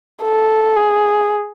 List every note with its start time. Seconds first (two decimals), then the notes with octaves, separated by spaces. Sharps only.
0.23 A4
0.77 G#4